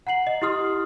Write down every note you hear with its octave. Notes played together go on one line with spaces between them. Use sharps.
F#5 A#5 C7 F#7
D#5
E4 G4 C6 D#6 F6